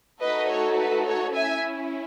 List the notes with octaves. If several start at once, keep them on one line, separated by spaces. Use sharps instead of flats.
A3 D#4 F#4 A4 B4 D#5
C#5
B4
C#5
C#4 E4 E5 G#5